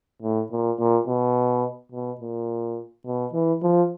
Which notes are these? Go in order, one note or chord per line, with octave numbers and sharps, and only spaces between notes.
A2
A#2
A#2
B2
B2
A#2
B2
E3
F3